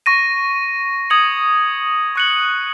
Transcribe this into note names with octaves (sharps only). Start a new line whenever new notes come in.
C#6 A#6 D#7
D#6 G#6 C#7 F#7
C#6 F#6 C#7 F#7